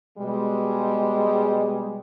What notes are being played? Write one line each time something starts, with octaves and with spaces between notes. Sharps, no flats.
B2 G3 G#3